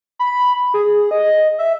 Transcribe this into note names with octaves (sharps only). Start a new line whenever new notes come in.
B5
G#4
D#5
E5